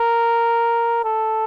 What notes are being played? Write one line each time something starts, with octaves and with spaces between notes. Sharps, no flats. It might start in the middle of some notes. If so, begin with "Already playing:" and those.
Already playing: A#4
A4